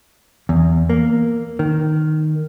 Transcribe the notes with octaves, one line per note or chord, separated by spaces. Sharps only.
E2
A#3
D#3